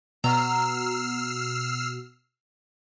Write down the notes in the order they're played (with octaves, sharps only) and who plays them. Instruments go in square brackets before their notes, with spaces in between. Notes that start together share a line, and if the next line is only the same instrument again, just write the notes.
[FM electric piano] B2 F#4 [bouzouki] A#5 [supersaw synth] E6 F6 C7